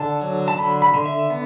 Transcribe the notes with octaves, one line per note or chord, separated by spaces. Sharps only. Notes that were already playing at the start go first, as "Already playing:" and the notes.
Already playing: D3 A5
F#3
A5
D3 B5
B5
D3
E5
B3